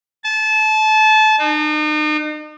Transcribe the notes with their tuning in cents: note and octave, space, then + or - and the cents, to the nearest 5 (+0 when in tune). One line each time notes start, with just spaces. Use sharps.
A5 -25
D#4 -40